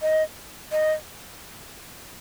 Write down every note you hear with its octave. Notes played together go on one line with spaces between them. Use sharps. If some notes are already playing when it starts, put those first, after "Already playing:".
D#5
D#5